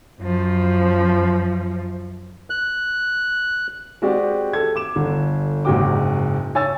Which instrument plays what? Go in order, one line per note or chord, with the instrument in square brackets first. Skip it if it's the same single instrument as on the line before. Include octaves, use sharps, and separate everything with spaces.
[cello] F#2 F3
[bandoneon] F#6
[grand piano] G#3 C4 F#4 G4 D5
A4 G#6
D6 E7
G1 D3
F#1 G#2 D#4 F#4 G5 D6
C#5 G#5 C#6 E6 A6